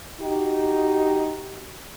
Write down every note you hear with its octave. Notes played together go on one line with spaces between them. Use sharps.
D#4 F#4 G4